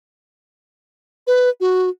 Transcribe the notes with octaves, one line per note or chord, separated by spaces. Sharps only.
B4
F#4